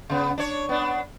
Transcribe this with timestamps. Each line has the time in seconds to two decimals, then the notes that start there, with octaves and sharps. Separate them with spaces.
0.10 C#3 B3
0.38 D4 C#5
0.69 B3 D4